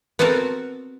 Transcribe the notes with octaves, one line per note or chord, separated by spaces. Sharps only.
B3 C4 F#4 A4 A#4